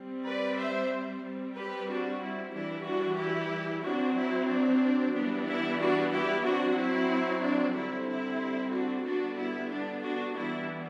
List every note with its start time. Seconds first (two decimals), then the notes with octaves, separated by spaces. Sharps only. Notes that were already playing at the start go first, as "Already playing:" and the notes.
Already playing: G3 C4
0.26 B4 D5
0.58 C5 E5
1.24 G3 C4
1.56 G4 B4
1.89 D4 F#4
2.21 E4
2.53 E3 G3 D4 E4
2.86 D4 F#4
3.18 E4 G4
3.83 F#3 C4 D4 F#4
4.16 E4
4.49 D4
5.14 E3 G3 B3 D4
5.47 E4
5.78 D4 F#4
6.11 E4 G4
6.43 F#3 C4 D4 F#4
6.76 E4
7.41 D4
7.74 D3 G3 C4 E4
8.07 E4
8.71 D4 F#4
9.03 D3 G3 B3 D4 F#4
9.37 E4
9.70 D4
10.02 D4 F#4
10.34 E3 G3 B3 D4 E4